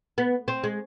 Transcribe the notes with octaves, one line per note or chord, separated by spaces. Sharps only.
B3
C4
G#3